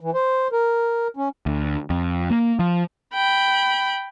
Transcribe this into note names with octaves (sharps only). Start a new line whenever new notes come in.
E3
C5
A#4
C#4
D2
F2
A#3
F3
G5 B5